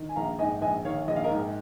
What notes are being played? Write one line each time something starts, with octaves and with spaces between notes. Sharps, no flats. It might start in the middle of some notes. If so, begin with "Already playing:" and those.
Already playing: D#3
G#5
A#1 F5 A#5
G#2 D#5 G#5
A#1 D#5 G#5
D#3 C#5 F5
A#1 D#5
F5
A#4 D#5
G#2